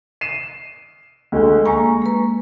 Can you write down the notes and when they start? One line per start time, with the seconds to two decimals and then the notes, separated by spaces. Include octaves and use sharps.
0.21 C7 D#7 E7
1.32 D2 G#3 A3
1.66 G#3 A#3 G#5 A#5 C#6
2.02 A#3 B4